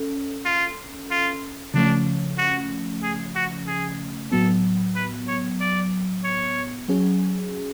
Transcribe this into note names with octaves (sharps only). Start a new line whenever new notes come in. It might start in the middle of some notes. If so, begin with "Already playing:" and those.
Already playing: C#4 A4
F4
F4
C#3 F3 A3 C#4 D4
F#4
G#4
F#4
G#4
A2 F#3 B3 A4
B4
C#5
D5
C#5
F#3 C#4 G#4